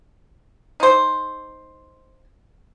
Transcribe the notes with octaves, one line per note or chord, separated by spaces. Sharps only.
D#4 C5